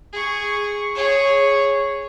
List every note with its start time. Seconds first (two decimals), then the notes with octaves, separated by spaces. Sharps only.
0.13 G#4 C#6
0.95 G#4 C#5